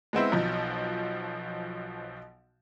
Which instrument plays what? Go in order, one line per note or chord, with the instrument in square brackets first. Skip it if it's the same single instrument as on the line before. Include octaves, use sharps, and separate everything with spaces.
[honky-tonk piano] G#3 B3 C4 E4
B1 B2 F3